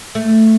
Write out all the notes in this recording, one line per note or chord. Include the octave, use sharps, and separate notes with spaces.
A3